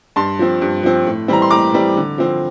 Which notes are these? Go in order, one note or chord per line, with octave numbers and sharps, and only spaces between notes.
G2 A5 C6
F3 C4
G2
F3 C4
A2
E3 G3 C4 A#5
C6
A2 A#5 D6
E3 G3 C4
D3
F3 C4